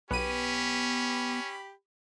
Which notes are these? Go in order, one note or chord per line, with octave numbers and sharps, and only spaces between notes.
B1 B3 C#4 G4 B5 D#7